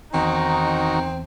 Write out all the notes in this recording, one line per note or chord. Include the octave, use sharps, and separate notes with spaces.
E2 D#3 C4 D#4 F#4